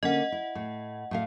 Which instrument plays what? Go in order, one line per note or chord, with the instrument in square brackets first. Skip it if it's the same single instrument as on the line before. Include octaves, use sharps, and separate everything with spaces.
[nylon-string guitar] D3 A#3 C#4 [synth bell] D#5 F#5
[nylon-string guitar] E4
A2
A2 A3 F5